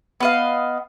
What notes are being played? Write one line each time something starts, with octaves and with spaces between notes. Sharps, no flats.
B3 D#5 F5